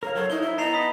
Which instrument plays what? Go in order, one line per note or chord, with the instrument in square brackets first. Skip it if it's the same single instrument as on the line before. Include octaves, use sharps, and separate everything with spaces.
[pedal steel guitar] A#4 F5 [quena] C#5
[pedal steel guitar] F#3 A4 C5 [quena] C#5
[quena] D#4 [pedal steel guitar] E4 [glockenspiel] G7
[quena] E5
[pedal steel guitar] B3 A5 [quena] D#5 [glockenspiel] A#5 C7 F7
[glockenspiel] B5 D#6 B6